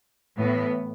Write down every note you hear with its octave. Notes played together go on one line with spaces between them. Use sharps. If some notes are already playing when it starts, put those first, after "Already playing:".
A2 E3 B3